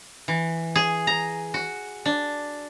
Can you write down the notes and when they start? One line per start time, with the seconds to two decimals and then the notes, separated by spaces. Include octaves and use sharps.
0.28 E3
0.76 G#4
1.07 A#5
1.54 F#4
2.06 D4